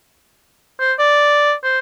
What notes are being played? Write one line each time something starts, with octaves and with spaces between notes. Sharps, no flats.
C5
D5
C5